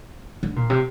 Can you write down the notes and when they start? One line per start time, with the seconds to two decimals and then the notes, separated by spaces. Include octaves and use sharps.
0.43 D3
0.56 A#2
0.70 C3